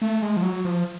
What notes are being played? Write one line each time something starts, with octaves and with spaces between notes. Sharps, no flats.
A3
G#3
F3
F#3
F3